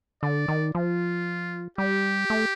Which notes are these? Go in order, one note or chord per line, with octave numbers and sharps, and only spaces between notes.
D3 D5
D#3
F3 F4
G3 G4
A3